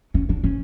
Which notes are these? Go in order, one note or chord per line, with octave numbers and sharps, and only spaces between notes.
C#4
D4
C#4